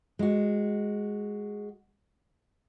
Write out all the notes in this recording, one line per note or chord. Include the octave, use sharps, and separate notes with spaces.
G#3 F#4